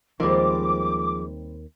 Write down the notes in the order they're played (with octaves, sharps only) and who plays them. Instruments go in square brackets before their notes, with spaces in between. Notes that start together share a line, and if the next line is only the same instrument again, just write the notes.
[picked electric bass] D#2 D#3 [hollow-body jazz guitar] F3 G#3 [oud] G3 C4 [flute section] D6